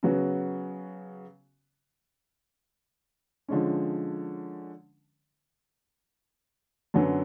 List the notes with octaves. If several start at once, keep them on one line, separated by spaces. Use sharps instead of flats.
C#3 F#3 B3 F#4
D3 F3 G#3 C#4
F#2 D3 F#3 B3